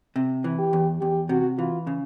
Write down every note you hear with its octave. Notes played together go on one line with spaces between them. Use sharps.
C3
E3
G4
E2
E2 G4
C3 F#4
E3 F4
C#3